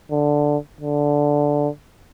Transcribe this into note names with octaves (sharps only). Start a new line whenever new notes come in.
D3
D3